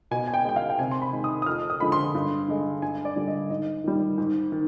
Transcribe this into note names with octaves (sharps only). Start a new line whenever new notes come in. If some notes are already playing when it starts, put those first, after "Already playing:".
B2 G#5
G#5
G5
G#3 G5
F5
G5
C3 G#5
C6
B5
D#3 G#3
D#6
D#6
F2 F6
D#6
D3 F3 G#3 B5
C6
G2
D3 G#3
G2 G#5
D5
D3 G3
D#5
G#2 D#5
D#3 G3
G#2
D#3